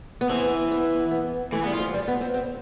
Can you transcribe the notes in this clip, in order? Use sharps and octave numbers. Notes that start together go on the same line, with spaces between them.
B3
E3 C4
B3
B3
E3 A3
G3 B3
F4
F3
G3
B3
C4
C4